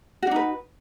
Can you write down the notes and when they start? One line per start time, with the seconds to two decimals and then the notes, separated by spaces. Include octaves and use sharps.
0.22 F#4
0.27 D4
0.31 D#4
0.36 B4